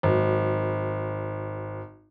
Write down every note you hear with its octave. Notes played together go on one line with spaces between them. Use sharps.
G#1 F#3